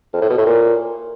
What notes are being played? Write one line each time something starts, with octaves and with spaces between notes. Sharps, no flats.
F2
A2
B2
A2
A#2